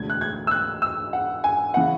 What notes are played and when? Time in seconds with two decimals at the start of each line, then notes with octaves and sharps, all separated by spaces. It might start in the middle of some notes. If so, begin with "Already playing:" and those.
Already playing: E1 D2 D3 G#6
0.10 F#6
0.21 G#6
0.47 E6
0.51 F#6
0.82 E6
1.13 F#5
1.44 G#5
1.74 C#3 E3 F#5